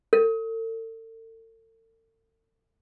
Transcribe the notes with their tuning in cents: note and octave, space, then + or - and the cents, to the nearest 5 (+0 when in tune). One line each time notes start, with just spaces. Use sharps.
A4 +40